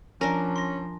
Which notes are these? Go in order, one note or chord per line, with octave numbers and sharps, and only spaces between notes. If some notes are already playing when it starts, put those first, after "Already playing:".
F3 C#4 D4 A#4 G#5 A#5 A#6
C6 A#6